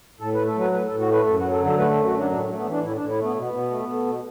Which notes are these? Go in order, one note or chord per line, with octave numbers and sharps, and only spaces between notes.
A2 A4
A3 B4
A4
F#3 B4
A2 B4
A4
A2
F#4
A3 B4
F#2 A4
F#4
F#3
A4
D3
A4
A3 B4
A4
F#2
F#4
F#3 D4
A2 D4
A3
B3
E3
D4
A2 E4
A2 D4
E4
A3 B3
B2 B3
B2
A3
A3
B2